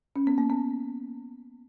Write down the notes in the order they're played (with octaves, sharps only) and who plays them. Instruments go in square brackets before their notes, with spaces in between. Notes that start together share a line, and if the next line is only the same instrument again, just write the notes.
[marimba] C#4
B3
A#3
B3